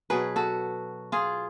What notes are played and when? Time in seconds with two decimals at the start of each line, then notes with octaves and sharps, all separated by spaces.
0.10 B2 F#3 G#4 B4
0.36 F#4 A4
1.12 F4 G#4